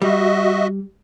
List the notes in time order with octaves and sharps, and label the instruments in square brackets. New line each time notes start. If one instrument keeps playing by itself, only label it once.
[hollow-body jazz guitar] G3 [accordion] F#4 D#5 E5